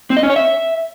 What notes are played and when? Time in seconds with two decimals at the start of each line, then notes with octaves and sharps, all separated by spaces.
0.10 C4
0.17 D#5
0.23 C#4
0.30 C#5
0.36 E5